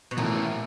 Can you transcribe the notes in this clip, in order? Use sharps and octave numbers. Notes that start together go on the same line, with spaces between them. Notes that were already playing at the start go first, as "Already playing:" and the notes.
B2
A#2 E3 A3 C#4 E4